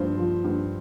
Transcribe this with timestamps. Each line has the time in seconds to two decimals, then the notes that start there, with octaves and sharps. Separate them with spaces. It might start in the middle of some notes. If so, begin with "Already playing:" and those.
Already playing: G2 F3 C5
0.18 F3
0.44 G2